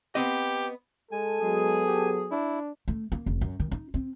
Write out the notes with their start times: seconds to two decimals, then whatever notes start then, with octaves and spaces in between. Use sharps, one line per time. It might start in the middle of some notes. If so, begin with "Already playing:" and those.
0.15 B3 C4 G4 D#5
1.12 G#3 A4 G#5
1.42 F#3 G#3 B3 G#4
1.86 G4
2.31 D4 E4
2.88 A3
3.12 A#3
3.26 F1
3.41 F#2
3.60 D#3
3.71 D#4
3.94 C4